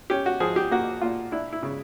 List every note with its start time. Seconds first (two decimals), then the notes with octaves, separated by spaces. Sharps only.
0.10 C#4 G4
0.26 F#4
0.40 F3 G#4
0.56 G4
0.71 A#3 F#4
1.01 A#2 F4
1.32 D4 E4
1.53 E4
1.63 C#3